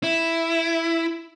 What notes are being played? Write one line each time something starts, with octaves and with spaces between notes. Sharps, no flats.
E4